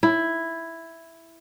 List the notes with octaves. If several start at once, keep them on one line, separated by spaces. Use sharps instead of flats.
E4